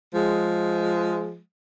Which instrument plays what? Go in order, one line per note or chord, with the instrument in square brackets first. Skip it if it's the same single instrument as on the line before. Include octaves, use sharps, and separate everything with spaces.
[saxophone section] F3 G#3